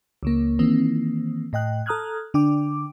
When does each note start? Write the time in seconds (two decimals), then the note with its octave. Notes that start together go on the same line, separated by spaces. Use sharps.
0.23 C#2 C#3 A#3
0.59 D#3 E3 A#3 C4
1.53 A2 D#5 G5 F#6
1.86 A4 A#5 D#6 F6 F#6 G#6
2.34 D3 D4 G5 D6